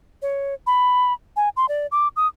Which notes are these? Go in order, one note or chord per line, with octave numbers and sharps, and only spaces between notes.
C#5
B5
G#5
C6
D5
D6
D#6